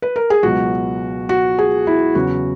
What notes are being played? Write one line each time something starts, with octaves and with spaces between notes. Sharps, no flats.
B4
A#4
G#4
C#2 B2 F#3 F#4
F#4
G#4
E4
E2 C#3 F#3 F#4